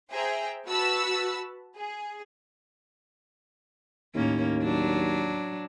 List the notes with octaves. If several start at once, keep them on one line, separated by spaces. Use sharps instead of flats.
G#4 C5 E5 G5 A#5
F#4 B4 A5 B5 E6
G#4
D#2 A2 A#3 C#4
F#3 D4